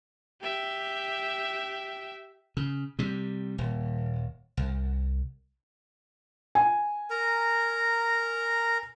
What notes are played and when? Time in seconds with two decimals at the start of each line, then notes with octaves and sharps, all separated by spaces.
0.41 G4 E5
2.57 C#3
2.99 C3 G3
3.58 D#1
4.57 C2
6.55 G#5
7.10 A#4 A#5